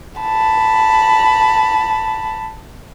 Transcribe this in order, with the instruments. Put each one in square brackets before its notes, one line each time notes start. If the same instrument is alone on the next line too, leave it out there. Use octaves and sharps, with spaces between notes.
[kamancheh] A5 B5